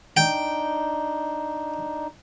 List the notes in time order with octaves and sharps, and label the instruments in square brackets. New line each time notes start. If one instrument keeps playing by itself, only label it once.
[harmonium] D4 D#4 [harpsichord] G5